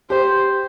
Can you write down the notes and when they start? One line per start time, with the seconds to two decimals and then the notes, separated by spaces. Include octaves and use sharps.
0.10 G4 C5